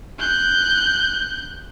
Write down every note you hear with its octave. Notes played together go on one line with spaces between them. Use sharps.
F#6 G6